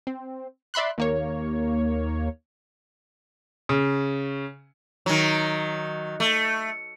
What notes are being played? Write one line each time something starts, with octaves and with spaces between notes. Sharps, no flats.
C4
D5 E5 B5 C6 F#6
D#2 A#3 C#5
C#3
D#3 F#3
A3